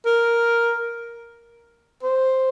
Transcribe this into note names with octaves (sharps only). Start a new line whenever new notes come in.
A#4
C5